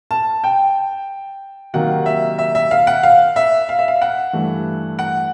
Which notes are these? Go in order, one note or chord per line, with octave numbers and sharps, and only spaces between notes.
A5
G5
C3 D#3 F#3 A#3 F#5
E5
E5
E5
F5
F#5
F5
E5
F5
E5
F5
F#5
G2 E3 A3
F#5